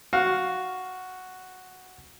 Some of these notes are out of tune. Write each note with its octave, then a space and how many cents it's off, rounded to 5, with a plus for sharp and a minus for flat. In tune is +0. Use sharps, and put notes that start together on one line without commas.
F#4 +0 F5 +15